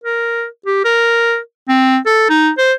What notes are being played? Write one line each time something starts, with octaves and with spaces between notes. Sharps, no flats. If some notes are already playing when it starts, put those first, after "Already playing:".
A#4
G4
A#4
C4
A4
D#4
C5